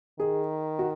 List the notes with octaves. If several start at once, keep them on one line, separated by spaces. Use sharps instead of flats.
D#3 G#4
F#4